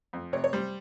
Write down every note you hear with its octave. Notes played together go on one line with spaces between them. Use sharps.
F2
C3 C#5
C#5
G3 C5